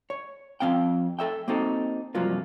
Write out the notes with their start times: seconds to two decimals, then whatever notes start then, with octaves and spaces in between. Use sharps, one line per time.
0.10 C#5
0.60 F2 E3 C4 F5 G5
1.19 A4 E5 G5
1.48 A#3 C4 D#4 F#4 A4
2.15 G2 C3 F3 F#3 A#3 F4